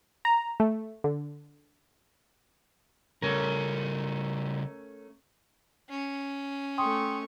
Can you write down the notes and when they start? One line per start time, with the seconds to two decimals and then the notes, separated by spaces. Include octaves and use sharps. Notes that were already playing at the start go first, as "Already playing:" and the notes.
0.25 A#5
0.60 A3
1.04 D3
3.22 C#3 G3 A3 C#4 A#4
5.89 C#4
6.78 A3 G5 C6 C#6 D#6